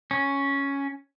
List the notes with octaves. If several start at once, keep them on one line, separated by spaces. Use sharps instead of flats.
C#4